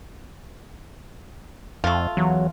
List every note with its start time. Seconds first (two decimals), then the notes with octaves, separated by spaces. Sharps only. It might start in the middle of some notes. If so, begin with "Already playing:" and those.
1.84 F2 A3 F4
2.17 E2 F#3